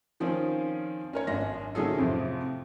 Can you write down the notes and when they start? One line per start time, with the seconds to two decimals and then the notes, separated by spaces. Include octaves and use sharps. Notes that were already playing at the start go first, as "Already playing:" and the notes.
0.20 D#3 F3 C4 C#4
1.13 C#4 A#4 C#5
1.27 G#1 F#2 C#4 D4 A#6
1.75 C3 D#3 F#3 C#4 G#4 A4
1.98 F2 A2 C3 F3